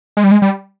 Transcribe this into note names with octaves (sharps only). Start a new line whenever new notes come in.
G#3
G3
G#3
G3